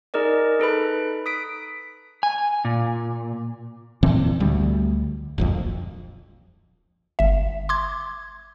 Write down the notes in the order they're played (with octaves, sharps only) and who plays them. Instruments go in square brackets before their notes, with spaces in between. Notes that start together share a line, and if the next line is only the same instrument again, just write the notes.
[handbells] D#4 G#4 A#4 D5 D#5
D#4 A4 B4 B5
D#6 B6 D7
[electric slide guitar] G#5
A#2
[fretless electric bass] A#2 D3 E3 C4
D2 G3
D1 A#1 F2
[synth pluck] G1 E5
C6 D6 G#6